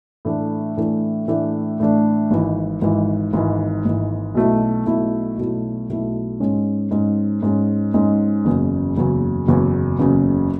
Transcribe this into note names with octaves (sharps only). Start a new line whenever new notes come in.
A2 E3 A3 D4
A2 E3 A3 D4
A2 E3 A3 D4
A2 E3 A3 D4
G#1 G#2 E3
G#1 G#2 E3
G#1 G#2 E3
G#1 G#2 E3
B1 B2 A3 E4
B1 B2 A3 E4
B1 B2 A3 E4
B1 B2 A3 E4
G#2 G#3 C#4
G#2 G#3 C#4
G#2 G#3 C#4
G#2 G#3 C#4
F#1 E2 C#3 F#3
F#1 E2 C#3 F#3
F#1 E2 C#3 F#3
F#1 E2 C#3 F#3